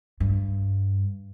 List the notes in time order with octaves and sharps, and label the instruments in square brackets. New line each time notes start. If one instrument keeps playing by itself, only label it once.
[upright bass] G2